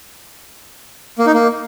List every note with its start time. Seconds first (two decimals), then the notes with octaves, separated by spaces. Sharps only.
1.19 A#3
1.26 D#4
1.34 A#3